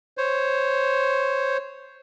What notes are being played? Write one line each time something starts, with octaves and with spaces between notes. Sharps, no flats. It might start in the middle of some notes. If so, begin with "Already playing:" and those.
C5 C#5